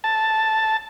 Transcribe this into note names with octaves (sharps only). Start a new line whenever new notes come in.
A5